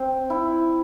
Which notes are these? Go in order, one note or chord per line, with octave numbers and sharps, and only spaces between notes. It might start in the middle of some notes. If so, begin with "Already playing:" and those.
Already playing: C4
E4